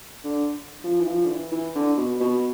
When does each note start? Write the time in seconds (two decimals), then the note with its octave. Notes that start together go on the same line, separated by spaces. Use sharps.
0.24 D3
0.84 F3
1.00 E3
1.07 F3
1.25 D3
1.30 E3
1.52 E3
1.75 D3
1.97 B2
2.20 B2